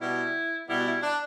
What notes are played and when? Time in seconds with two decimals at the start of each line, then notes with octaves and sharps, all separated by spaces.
0.01 B2 G3 B3 E4
0.69 B2 G3 B3 E4
0.86 E4
1.03 D4